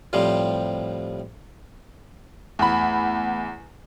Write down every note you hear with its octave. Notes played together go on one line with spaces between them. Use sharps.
A2 C3 F3 G3
E2 A3 F#5 B5